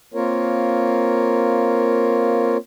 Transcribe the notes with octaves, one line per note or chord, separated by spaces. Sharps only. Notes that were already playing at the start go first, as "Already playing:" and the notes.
A#3 C4 F4 A#4 C#5